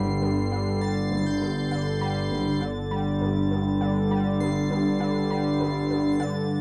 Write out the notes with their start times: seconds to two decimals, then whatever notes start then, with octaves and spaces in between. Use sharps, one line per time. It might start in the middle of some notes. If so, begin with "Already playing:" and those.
Already playing: G1 G2 D3 G3 C7
0.22 G2
0.52 D3
0.81 G3 A6
1.12 G1
1.17 A6
1.26 G6
1.42 G2
1.71 D3 A6
2.01 G3
2.31 G1
2.61 D3
2.91 G3
3.21 G2
3.51 G2
3.81 D3
4.11 G3
4.40 G2 C7
4.70 G2
5.00 D3
5.30 G3
5.60 G2
5.90 G2
6.12 C7
6.20 D3 A6